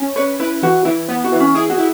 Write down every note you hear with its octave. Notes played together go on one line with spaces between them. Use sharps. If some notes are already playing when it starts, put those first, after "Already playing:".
Already playing: C#4
B4 C#5
E4 B4
E3 F#4
E3 E4
B3
F#4
E3
C#4
E4 G#4
F#4
E4